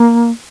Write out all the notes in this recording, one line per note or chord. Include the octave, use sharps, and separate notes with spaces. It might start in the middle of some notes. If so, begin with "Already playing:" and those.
Already playing: A#3